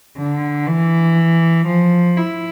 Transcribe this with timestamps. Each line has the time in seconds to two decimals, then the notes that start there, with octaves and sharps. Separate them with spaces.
0.18 D3
0.67 E3
1.67 F3
2.17 E4